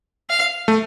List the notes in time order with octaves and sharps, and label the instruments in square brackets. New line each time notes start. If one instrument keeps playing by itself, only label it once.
[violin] F5
[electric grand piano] A3